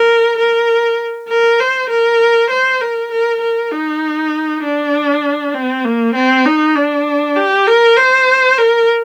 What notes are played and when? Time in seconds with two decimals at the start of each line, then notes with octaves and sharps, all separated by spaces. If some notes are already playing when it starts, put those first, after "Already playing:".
Already playing: A#4
0.38 A#4
1.28 A#4
1.59 C5
1.89 A#4
2.50 C5
2.81 A#4
3.11 A#4
3.41 A#4
3.72 D#4
4.63 D4
5.54 C4
5.84 A#3
6.15 C4
6.45 D#4
6.76 D4
7.36 G4
7.67 A#4
7.97 C5
8.57 A#4